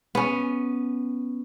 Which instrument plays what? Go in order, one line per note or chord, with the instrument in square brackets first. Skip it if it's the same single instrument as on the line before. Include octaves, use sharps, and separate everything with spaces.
[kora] B3 C#4